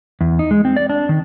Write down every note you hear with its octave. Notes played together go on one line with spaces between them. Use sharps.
E2
D#4
G#3
C4
D5
D4
D#3